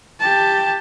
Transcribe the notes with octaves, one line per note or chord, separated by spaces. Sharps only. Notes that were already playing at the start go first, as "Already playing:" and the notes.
G4 A5